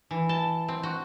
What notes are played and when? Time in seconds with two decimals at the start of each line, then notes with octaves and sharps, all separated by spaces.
0.11 E3
0.29 A5
0.68 C4
0.83 F#4